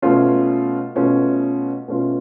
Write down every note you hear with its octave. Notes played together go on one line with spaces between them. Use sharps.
B2 A3 C#4 F4
B2 A3 C#4 F4
B2 A3 C#4 F4